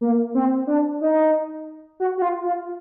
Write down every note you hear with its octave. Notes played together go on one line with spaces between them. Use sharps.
A#3
C4
D4
D#4
F#4
F#4
F4
F4